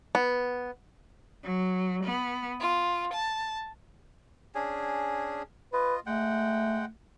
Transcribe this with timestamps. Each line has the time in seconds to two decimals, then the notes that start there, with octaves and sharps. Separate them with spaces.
0.15 B3
1.42 F#3
2.03 B3
2.59 F4
3.12 A5
4.55 C#4 D4 G#4
5.73 F4 B4 D#5
6.06 G#3 A3 F#5 G5